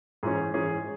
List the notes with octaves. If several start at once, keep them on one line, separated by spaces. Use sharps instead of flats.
G#2 E3 C#4 G#4
G#2 E3 C#4 G#4